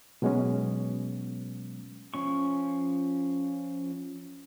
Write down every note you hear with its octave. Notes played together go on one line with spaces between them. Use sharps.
B2 F#3 G#3 B3 C#4
F3 C#4 C#6